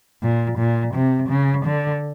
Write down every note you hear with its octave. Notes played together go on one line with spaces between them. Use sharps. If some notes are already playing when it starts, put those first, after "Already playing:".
A#2
A#2
C3
C#3
D3